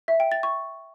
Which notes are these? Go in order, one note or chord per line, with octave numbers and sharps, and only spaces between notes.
E5
G5
A6
C#6